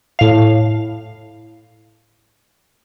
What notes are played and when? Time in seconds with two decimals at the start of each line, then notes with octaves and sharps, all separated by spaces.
0.19 A2 F5